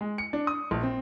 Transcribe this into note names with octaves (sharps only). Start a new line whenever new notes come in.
G#3
C#7
D4
D#6
A#1
C4